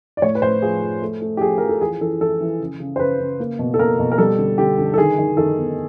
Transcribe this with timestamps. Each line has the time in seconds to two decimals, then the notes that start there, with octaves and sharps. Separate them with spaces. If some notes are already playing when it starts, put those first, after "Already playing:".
0.17 D5
0.22 A2 C#5
0.35 B4
0.42 A2 C5
0.62 F3 G#4
0.82 F3
1.02 A3
1.22 A3
1.37 G4
1.41 F3 G#4
1.58 F3 A#4
1.69 A4
1.81 E3 G#4
2.01 E3 A4
2.21 E3 A4
2.41 E3
2.60 C#3
2.80 C#3
2.96 C5
2.99 C#3 B4
3.20 C#3
3.40 A#3
3.59 B2
3.74 A4
3.79 A#3 A#4
3.99 B2
4.12 A#4
4.18 G3 A4
4.39 D3
4.58 D3 G4
4.79 D3
4.94 A4
4.97 D#3 G#4
5.18 D#3
5.37 D#3 A4
5.58 B3